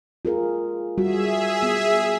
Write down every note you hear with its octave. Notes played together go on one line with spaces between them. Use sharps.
F4 G#4 A#4
G3 F#4 G#4 E5
B3